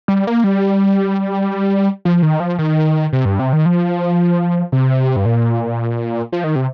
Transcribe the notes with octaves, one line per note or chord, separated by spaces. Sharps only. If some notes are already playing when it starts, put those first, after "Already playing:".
G3
A#3
G3
F3
D#3
F3
D#3
C3
G2
C3
D#3
F3
C3
G2
A#2
F3
D#3
C3